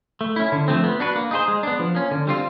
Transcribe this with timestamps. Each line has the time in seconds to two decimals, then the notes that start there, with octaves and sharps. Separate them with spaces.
0.21 A3
0.36 C#4 E4
0.52 D3
0.68 F3 A3 C4
0.84 B3
1.00 D4 F#4 B4
1.16 A#3
1.31 D#4 G#4 C5
1.48 G#3
1.63 B3 D4
1.79 F3
1.95 A#3 C#4
2.11 D3
2.27 G3 C4 F4